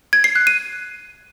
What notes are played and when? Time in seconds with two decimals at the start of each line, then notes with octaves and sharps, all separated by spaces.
0.13 G#6
0.24 C7
0.35 F#6
0.47 D#7